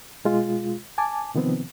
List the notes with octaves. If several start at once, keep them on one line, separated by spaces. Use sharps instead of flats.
B2 G#3 F4
G#5 A5 D6
C3 D#3 F3 B3 C4